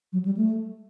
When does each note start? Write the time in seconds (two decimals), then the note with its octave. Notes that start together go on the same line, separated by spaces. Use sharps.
0.13 F#3
0.25 G3
0.37 A3